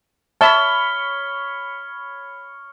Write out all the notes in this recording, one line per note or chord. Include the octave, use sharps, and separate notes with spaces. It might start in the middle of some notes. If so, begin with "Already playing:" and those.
C#5 E5 A5 B5 F6 G7